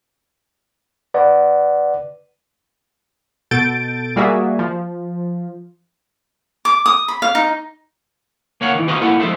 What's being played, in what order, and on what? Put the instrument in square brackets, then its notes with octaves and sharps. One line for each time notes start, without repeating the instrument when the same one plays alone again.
[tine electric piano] B4 D5 F#5
[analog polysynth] B2 A4 G6 A6 D7
G3 A#3 F#4 G#4 D5 E5
F3
[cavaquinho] D6
D#6
B5
F5
D#4
[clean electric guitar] A#3 C#5 F5 F#5
D#3 E3
F#4 B4 C5 D#5 F5 A#5
G3 A#3 E4 A4 F#5
F3 G#3 A4 C5 E5